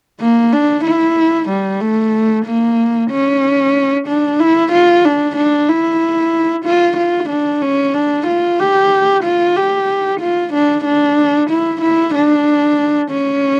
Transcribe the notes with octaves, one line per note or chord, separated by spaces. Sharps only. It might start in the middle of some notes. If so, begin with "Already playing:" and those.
A#3
D4
E4
G3
A3
A#3
C#4
D4
E4
F4
D4
D4
E4
F4
F4
D4
C#4
D4
F4
G4
F4
G4
F4
D4
D4
E4
E4
D4
C#4